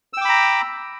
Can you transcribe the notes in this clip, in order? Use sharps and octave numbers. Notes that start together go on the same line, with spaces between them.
G5 A#5 B5 D6 E6